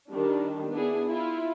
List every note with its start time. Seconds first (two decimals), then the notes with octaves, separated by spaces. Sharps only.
0.11 D#3 G3 D4
0.72 B3 D4 E4 G#4
1.08 E4 F4